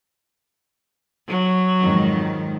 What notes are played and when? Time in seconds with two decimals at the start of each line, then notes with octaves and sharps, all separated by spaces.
1.28 F#3
1.82 F2 G#2 D#3